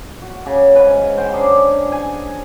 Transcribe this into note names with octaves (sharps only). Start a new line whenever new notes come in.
F#4
C#3
G#2 C#4 B4
C5 F#5 G5 C6
C#4 D4 G#4 A#5
G#5